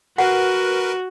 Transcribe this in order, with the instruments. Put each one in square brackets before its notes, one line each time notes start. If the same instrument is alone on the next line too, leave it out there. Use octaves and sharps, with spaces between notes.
[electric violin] F#4 [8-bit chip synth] A#4 B4 [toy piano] F#5